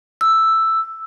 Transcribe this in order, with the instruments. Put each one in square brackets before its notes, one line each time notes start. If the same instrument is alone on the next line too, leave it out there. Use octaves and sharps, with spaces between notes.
[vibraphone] E6